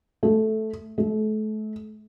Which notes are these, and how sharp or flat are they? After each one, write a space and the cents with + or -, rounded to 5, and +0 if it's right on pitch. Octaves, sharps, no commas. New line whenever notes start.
A3 -10
A3 -35